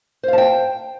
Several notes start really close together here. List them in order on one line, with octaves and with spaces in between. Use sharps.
C5 F5 A5 G5